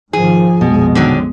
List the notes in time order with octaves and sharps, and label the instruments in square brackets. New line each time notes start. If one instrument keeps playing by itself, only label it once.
[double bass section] G#2 D#3 F3 [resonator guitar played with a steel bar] G#4
[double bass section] A#1 F2 G#3 [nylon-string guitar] B2
[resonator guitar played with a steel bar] D3 D#3 F#3